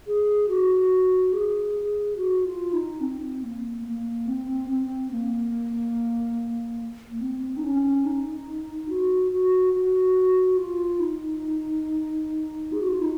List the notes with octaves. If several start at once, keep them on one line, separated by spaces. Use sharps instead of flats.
G#4
F#4
G#4
F#4
F4
D#4
C4
A#3
A#3
C4
C4
A#3
A#3
C4
D#4
C#4
D#4
F#4
F#4
F#4
F4
D#4
G#4
F#4
F4
D#4